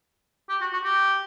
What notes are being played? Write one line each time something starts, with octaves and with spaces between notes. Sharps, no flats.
G4
F#4
F#4
G4